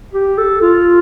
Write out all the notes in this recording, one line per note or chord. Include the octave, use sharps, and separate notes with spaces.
G4
A4
F4